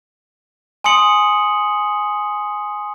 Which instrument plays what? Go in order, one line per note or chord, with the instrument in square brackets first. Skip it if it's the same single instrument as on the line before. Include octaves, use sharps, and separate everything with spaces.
[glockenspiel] G#5 C6 D#6 C#7 F#7